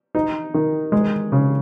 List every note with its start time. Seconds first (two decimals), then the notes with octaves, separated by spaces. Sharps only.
0.15 D#4
0.54 D#3
0.92 G#3
1.32 C#3